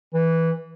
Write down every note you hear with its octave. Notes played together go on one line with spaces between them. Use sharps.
E3